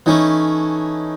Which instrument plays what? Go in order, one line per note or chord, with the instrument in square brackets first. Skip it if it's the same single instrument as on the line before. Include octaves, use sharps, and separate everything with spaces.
[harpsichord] E3 A3 C#4 [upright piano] D#4